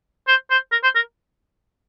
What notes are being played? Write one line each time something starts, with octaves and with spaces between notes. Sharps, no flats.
C5
C5
A#4
C5
A#4